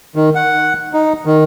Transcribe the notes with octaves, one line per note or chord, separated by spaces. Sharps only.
D#3
F#5
D#4
D#3